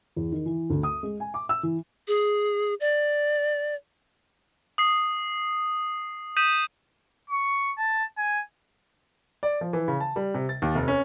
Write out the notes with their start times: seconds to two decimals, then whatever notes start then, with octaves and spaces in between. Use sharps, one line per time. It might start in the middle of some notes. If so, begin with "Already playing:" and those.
0.16 E2
0.32 D#3
0.46 E3
0.70 D2
0.83 D#6
1.03 G#3
1.20 G#5
1.34 D6
1.49 E6
1.63 E3
2.08 G#4
2.80 D5
4.78 D#6 C7
6.37 D#6 G6 B6 D#7 E7
7.30 C#6
7.78 A5
8.18 G#5
9.43 D5
9.61 F3
9.73 E3
9.88 C#3
10.00 A5
10.16 G3
10.34 C3
10.49 A6
10.62 D#2
10.75 F1
10.88 C#4